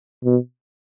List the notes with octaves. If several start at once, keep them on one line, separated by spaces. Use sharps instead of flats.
B2